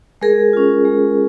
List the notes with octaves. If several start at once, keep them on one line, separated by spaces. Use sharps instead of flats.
G#3 G#4 A#4
C#4 F4
G#3